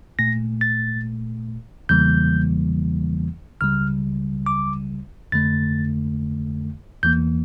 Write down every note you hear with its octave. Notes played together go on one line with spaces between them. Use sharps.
A#2 A3 A#6
A6
E2 C#3 E3 G3 A#3 G6
C#2 C#3 G3 F6
D6
F2 D3 A3 A6
E2 E3 A#3 G6